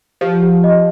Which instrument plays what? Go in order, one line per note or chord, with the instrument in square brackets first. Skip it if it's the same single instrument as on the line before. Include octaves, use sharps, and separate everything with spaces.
[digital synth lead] F3 [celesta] G4
[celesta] G4
D#5